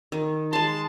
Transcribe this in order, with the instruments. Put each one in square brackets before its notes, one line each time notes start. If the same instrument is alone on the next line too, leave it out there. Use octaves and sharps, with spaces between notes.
[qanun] D#3
[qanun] G#3 C6 [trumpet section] A5